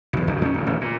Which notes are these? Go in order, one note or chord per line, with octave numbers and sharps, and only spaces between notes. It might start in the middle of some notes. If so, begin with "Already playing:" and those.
B1 E2
G#1 D2 C#3 F#3
E2 C4 C#4
D1 D2
D#1 A1
A#2